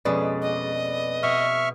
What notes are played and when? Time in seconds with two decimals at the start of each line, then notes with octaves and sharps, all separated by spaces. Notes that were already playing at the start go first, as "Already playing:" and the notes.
0.05 F2 B2 G#3 C#4 B4 D5
0.42 D#5
1.23 B2 E5 C#6 F6